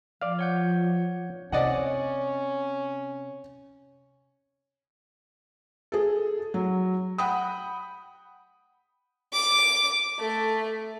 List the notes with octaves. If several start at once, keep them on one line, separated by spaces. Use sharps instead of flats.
F3 D5 F5
C#5 F#5 G6
C3 C#4 D5 D#5 F#5
G#4 A4
F#3
F#5 G5 B5 D#6
D6
A3